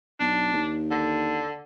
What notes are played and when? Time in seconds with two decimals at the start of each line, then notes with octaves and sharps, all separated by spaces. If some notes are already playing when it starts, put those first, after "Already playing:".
0.20 B1 D4
0.53 D#2
0.91 D3